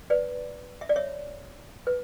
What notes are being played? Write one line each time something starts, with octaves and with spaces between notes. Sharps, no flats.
B4 D5
E5
D5
C#5 E5
B4